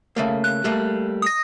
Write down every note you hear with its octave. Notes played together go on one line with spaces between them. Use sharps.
C#3 A3 A#3
F#6
G3 A3 A#3
D#6 A#6